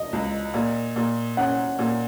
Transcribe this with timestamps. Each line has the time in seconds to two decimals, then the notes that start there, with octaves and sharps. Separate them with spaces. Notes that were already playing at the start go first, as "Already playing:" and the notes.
Already playing: D#5
0.13 C#2
0.54 A#2
0.96 A#2
1.37 C#4 F#5
1.79 A#2